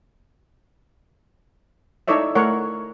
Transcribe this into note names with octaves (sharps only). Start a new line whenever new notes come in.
D#4 E4 A4 C#5 D5 E5
A3 E4 A#4 C#5 F#5